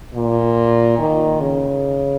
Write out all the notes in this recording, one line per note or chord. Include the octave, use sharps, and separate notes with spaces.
A#2
D#3
C#3